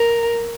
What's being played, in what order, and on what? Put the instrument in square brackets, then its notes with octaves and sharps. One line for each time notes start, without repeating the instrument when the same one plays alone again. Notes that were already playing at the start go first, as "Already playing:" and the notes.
Already playing: [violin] A#4